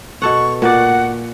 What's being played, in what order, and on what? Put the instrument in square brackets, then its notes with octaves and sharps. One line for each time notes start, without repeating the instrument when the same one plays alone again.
[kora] B2 A4 F#5 [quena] C#6
[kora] A#2 D5 [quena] F#5